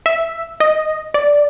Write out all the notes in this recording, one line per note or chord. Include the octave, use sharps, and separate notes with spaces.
E5
D#5
D5